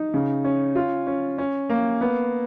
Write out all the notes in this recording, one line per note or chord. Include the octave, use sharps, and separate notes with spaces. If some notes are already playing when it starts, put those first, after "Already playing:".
Already playing: D#4
C#3
C#4
F4
C#4
C#4
A#3
B3